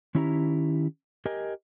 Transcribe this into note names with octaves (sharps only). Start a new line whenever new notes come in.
D#3 C#4 E4 G4 F#5 A#5
G4 A#4 D#5 G#5